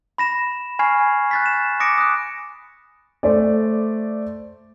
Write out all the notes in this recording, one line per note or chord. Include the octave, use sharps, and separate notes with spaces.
B5 A#6 E7
G#5 B5 C#6 F6 G#6 C7
F#6 A6 B6
E7
D6 D#6 A#6 C#7 D7
D#6 F#6
A3 C5 D5